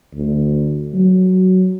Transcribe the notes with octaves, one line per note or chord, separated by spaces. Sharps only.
D2
F#3